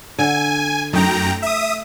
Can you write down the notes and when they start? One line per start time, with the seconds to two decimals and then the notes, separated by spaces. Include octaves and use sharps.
0.18 D3 G#5
0.93 F#2 A3 D#4 G5 A#5
1.42 E5 D#6